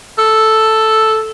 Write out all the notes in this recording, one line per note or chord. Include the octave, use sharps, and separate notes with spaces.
A4